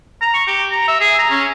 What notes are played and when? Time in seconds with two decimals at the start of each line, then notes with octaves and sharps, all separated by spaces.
0.21 A#5
0.34 C#6
0.48 G4
0.71 A#5
0.88 E5
1.00 G#4
1.19 A#5
1.30 C#4